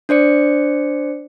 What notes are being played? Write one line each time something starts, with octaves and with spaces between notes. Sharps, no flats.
D4 C5 D5 C#7